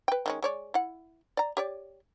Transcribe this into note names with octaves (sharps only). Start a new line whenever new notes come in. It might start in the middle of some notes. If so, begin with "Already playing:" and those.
B4 G5
D#3 G#3 C#4
G#3 C#5 D5
E4 F#5
D5 A#5
G4 C#5 D5